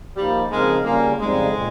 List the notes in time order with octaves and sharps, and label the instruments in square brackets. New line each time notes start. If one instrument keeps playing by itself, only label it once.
[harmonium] F3 A#3 D#4 [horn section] G3
[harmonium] C#3 F3 C4 D#4 A#4 [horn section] G#3
[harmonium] C#3 G3 C#4 F4 [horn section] A#3
[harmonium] F2 C#3 G3 C4 D#4 [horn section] G#3
[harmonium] A#2